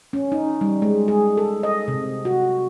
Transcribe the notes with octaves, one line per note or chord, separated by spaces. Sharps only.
C#4
D#4
G3
G#3
G#4
A4
D#5
C3
F#4